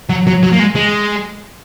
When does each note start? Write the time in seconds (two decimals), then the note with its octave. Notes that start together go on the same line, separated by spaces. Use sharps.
0.09 F#3
0.27 F#3
0.43 F#3
0.52 A#3
0.59 G#3
0.75 G#3